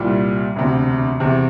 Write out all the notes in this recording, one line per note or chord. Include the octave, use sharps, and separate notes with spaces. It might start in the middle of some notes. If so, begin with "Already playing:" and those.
Already playing: C2 A#2 G3
E1 D2 C3
E2 C3 E3